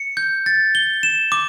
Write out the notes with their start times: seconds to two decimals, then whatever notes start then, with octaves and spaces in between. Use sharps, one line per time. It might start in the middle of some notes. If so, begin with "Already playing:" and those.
Already playing: C#7
0.17 G6
0.46 A6
0.75 G7
1.03 E7
1.32 D6